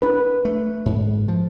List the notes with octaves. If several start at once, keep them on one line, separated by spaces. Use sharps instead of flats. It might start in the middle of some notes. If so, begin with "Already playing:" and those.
D4 B4
A3
G#2
F3